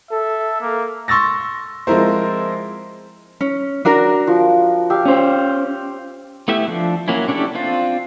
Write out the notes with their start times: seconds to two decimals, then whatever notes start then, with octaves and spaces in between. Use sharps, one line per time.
0.11 A4 E5
0.61 A#3
1.08 C6 C#6 E6 A6 A#6
1.87 F3 G#3 C4 E4 A#4 C5
3.41 C#4
3.85 D4 F#4 A#4
4.27 F3
4.90 G4 E5 F5
5.05 C#4 C5
6.48 A3 B3 E4 G4 E5
6.68 F3 D4
7.08 F#3 A#3 C#4 E4
7.28 C#4 D4 E4 G4 A4
7.55 C4 D4 F4